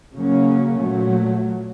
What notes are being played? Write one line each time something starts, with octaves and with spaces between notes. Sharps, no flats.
C#3 F#3 A#3 C#4
A#2 F#3 A3